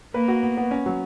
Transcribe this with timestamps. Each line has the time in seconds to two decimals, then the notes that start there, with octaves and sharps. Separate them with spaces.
0.14 A#3 B4
0.28 F#4
0.43 B3
0.57 B3
0.71 C#4
0.86 F#3